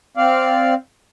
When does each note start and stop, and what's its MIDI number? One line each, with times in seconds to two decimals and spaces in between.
0.17 0.74 60
0.17 0.74 74
0.17 0.74 77